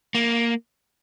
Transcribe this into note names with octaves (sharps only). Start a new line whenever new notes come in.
A#3